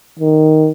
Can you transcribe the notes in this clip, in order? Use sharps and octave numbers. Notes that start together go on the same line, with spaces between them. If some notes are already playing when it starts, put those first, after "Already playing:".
D#3